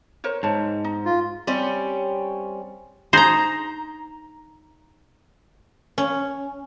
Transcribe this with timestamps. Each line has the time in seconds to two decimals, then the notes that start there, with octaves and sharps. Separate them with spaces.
0.24 A#4 C5 C#5
0.43 G#2 C#5 A5
0.85 D#4
1.05 F4
1.47 G3 C4 C#4
3.13 D#4 G#4 C5 A#5 C6
5.98 C#4